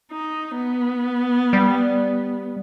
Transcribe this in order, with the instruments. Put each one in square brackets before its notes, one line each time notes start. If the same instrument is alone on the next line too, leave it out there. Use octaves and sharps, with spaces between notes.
[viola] D#4
B3
[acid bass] G3